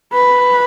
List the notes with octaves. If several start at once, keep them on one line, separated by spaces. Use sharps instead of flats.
B4